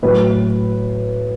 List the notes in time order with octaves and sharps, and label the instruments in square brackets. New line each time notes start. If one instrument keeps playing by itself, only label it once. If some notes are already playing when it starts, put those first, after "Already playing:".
[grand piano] A2 F#3 B4